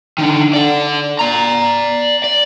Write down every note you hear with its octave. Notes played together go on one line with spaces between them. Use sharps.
D3 D#3
A4 D5
D5 A#5
D5